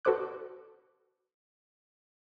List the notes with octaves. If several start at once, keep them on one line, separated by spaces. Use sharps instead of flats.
F#4 A4 B4 C5 D6 F#6